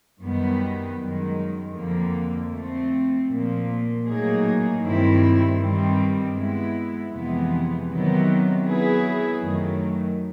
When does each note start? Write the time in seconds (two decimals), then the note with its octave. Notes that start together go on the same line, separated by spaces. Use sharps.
0.21 F#2 D#3 G3 B3
0.98 F#2 D#3 G#3
1.75 F2 D3 F3 A#3
2.51 F3 A3 C4
3.28 A#2 F3 A#3
4.05 A2 F#3 A#3 D#4 G#4
4.82 G2 D#3 G3 C4 E4
5.58 G2 D#3 G3 C4
6.34 G#3 B3 E4
7.11 F2 C3 E3 G#3 B3
7.88 C3 D#3 F#3 B3
8.64 F#3 B3 E4 G#4 B4
9.41 F#2 D#3 F#3 A3